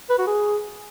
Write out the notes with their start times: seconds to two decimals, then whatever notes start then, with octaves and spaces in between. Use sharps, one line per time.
0.10 B4
0.18 F#4
0.27 G#4